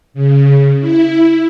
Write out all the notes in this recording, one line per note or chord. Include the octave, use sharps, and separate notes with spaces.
C#3
E4